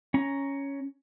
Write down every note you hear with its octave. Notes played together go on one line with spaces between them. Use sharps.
C#4 A#5